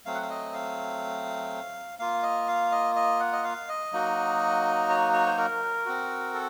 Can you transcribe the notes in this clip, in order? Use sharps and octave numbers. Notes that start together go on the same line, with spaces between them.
F#3 A3 C4 F5
F#5
F5
D#5
F5
A#3 F4 F5
D#5
F5
D#5
D#5
F#5
D#5
F5
D#5
F#3 A#3 D#4 F#4
C#5
C#5
C5
A#4
C4 F#4
A4